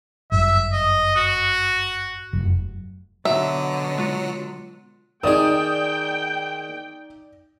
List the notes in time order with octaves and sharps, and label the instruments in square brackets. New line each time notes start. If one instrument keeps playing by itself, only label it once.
[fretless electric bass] G1 F#2 [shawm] E5
[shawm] D#5
F#4
[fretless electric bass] F1 F#2
[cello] B2 D3 [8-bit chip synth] F#3 [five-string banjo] E5
[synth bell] G#3 F4 C#7
[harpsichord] D#3 G#4 [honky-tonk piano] D#4 D#6 [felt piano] D5 [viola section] G5